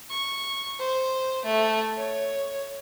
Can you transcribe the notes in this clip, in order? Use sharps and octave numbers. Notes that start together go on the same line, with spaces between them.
C#6
C5
A3
C#5